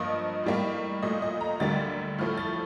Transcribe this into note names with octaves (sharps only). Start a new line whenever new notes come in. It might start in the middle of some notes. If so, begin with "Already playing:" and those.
Already playing: G2 F3 A#3 D#5
A2 G3 A#3
A#2 A3 D#5
D#5
A#5
D2 D3 G3 A#3 A6
A2 F3 A3 F6
A6